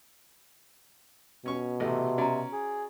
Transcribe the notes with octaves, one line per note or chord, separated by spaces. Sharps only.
B2 C#4 C#6
A1 C3 A3 D#5
C#4 F#4 D5 A#5
G#4